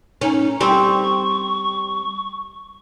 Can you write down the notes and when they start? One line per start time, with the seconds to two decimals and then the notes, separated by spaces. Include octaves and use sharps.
0.21 C#4 D#4
0.61 G3 C4 C#6